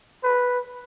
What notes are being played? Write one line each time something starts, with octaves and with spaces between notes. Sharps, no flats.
B4